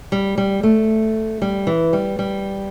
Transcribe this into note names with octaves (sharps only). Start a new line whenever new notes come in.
G3
G3
A3
G3
E3
G3
G3